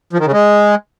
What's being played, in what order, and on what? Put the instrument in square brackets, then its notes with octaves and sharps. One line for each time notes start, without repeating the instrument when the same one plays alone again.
[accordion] F3
D#3
C#3
G#3